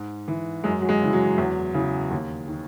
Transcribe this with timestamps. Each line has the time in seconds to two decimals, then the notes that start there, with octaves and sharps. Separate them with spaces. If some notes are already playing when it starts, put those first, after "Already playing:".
Already playing: G#2
0.28 E3
0.64 F#2 G#3
0.81 F#3
0.89 G#3
1.02 C#3 E3
1.13 F#3
1.38 E2
1.74 C#3 E3
2.11 D#2
2.48 D#3